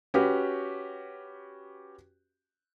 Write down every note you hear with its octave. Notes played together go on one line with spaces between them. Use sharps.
C#4 F#4 G4 B4